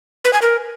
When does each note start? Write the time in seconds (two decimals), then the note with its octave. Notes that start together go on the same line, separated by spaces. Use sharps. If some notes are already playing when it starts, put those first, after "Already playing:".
0.25 B4
0.33 G#5
0.42 A#4